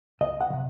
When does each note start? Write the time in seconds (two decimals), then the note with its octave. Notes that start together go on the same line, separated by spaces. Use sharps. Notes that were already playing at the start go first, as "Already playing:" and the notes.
0.21 C#2 D#5
0.41 F#5
0.50 D#3
0.53 C3